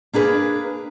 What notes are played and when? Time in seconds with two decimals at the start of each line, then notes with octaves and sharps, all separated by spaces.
0.13 A#3 D4 G#4 B4